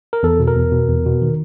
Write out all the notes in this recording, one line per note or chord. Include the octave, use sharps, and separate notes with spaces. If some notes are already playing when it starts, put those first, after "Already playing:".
A#4
E2 A4
B2
A#4
E2
B2
E2
B2
D#3